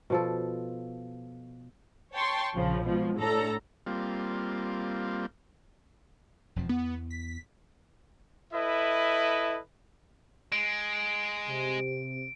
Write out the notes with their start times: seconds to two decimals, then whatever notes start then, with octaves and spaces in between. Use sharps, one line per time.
0.10 B2 F3 A4
2.14 C#5 G5 A5 C6 C#6
2.56 A#1 C#3 F3
2.85 B2 F3 G#3
3.17 A2 D4 A4 A#5
3.86 G3 A#3 C4 F4
6.56 E1 F2 F3
6.69 E2 B3
7.10 B6
8.53 E4 A4 B4 D#5 E5
10.52 G#3 D7
11.48 C3